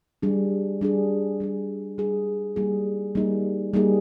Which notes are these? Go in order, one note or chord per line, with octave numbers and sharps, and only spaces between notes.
G3 D4 G#4
G3 D4 G#4
G3 D4 G#4
G3 D4 G#4
G3 A#3 D#4 G#4
G3 A#3 D#4 G#4
G3 A#3 D#4 G#4